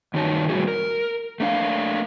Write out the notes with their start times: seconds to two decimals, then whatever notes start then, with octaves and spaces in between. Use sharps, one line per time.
0.14 G2 D#3 D#4 F#4 C#5 A5
0.49 A2 G3 G#3 E4 F#4 G#4
0.68 A#4
1.40 A3 A#3 D4 A#4 F5